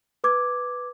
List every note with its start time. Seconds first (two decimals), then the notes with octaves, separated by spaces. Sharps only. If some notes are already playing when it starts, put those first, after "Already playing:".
0.24 B4 D6 G#6